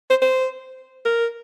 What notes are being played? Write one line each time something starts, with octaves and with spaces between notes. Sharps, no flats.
C5
C5
A#4